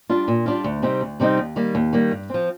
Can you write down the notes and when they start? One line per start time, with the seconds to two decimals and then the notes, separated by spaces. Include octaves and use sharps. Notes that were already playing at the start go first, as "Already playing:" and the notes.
0.09 G3 D4 F4
0.28 A#2
0.46 G3 D4 F4
0.64 D2
0.82 C3 G3 C4 D#4
1.01 D2
1.20 C3 G3 C4 D#4
1.38 D#2
1.56 D#3 G3 A#3
1.75 D#2
1.93 D#3 G3 A#3
2.11 G2
2.30 F3 C4